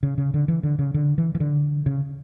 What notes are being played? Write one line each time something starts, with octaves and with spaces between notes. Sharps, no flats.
C#3
C#3
D3
E3
D3
C#3
D3
E3
E3
D3
C#3